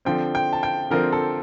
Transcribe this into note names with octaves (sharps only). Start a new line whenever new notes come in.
D3 F3 C4 G5
G5
A5
G5
D3 F3 C4 A#4
A4